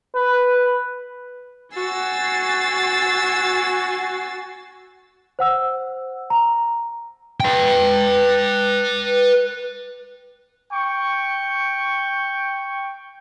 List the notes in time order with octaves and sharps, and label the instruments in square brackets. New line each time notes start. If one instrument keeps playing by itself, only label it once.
[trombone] B4
[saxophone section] F#4 [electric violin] G#5 C7 [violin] E6 A6
[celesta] C5 F#5 E6
A#5
[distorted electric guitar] B4 G5
[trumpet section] G5 C#6